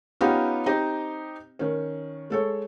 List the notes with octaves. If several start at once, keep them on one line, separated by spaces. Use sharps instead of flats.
B3 C#4 D#4 F4 G4
C4 D#4 G4 D#5
D#3 C#4
G#3 A4 C#5